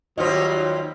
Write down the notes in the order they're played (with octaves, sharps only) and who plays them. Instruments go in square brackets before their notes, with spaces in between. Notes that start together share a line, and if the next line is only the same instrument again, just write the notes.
[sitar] D#2 G3 F4 [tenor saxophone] F#3 [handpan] C5 D#5